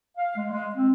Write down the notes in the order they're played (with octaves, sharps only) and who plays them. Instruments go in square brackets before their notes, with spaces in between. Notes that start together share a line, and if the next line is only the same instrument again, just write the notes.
[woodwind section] F5
G#3
G#3
C4